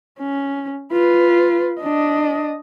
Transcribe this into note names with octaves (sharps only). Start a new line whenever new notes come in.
C#4
F4 B4
D4 D#5